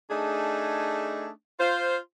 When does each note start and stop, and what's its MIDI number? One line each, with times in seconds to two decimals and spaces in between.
0.11 1.29 57
0.11 1.29 62
0.11 1.29 63
0.11 1.29 68
1.59 1.97 65
1.59 1.97 72